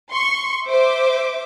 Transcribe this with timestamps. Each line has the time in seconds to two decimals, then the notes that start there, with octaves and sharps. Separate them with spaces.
0.12 C6 C#6
0.68 C5 E5 D6